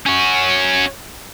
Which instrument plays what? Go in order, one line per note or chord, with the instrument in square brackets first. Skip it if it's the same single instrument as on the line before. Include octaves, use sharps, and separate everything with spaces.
[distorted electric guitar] C#4 F#4